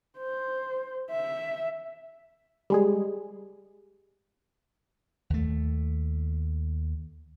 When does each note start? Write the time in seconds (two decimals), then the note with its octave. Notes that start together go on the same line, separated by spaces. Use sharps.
0.18 C5
1.11 E5
2.70 G3 G#3 G#4
5.30 D#2 A3